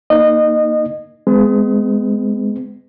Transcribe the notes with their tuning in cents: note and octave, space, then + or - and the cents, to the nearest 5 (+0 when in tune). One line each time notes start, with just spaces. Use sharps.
A#3 +0 D#4 +0 D#5 -25
G#3 +0 B3 +40